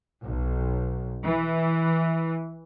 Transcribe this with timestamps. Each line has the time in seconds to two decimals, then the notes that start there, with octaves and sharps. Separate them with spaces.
0.24 B1
1.24 E3